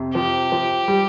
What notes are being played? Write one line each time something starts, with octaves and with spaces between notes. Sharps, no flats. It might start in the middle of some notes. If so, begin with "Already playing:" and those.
Already playing: F2 C3
F3 G4
F3
G3